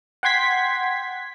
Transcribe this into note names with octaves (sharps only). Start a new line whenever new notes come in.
F#5 G5 C6 G#6 B6